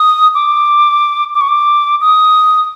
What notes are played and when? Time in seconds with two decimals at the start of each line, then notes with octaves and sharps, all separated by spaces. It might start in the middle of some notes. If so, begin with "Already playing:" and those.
Already playing: D#6
0.35 D6
1.34 D6
1.41 C#6
1.48 D6
2.01 D#6